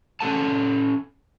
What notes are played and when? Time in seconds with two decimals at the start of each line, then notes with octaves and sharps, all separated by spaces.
0.21 C#4 E4 A4 F#5 A5